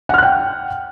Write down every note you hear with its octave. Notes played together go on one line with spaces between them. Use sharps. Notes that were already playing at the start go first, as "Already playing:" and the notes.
F#5 G5 F6 F#6